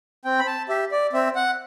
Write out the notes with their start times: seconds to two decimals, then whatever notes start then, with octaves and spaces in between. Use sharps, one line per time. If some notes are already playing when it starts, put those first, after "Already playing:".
0.24 C4 G5
0.39 B5
0.47 A5
0.69 G4 E5
0.91 D5
1.13 C4 E5
1.35 F#5